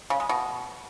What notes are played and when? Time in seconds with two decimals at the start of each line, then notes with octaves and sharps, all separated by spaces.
0.10 C#3
0.20 G#3
0.29 B2